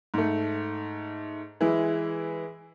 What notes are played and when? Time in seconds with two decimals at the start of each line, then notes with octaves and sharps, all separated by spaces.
0.14 G#2 A3
1.61 E3 G#3 E4